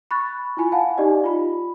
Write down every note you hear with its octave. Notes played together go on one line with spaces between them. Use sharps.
B5 C#6 F#6 A6
E4 F4 G#5 B5
F5 F#5 G#5 A5
D#4 G4 D5 D#5
F4 B5